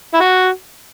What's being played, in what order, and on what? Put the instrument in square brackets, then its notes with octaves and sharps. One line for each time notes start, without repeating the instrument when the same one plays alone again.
[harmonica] E4
F#4